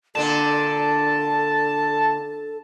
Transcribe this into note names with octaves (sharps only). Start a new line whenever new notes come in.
A#2 D3 D4 A4 A5